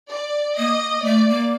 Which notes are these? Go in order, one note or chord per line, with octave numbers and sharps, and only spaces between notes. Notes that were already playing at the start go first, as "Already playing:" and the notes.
D5
A#3 D#5
A3 D5
A#3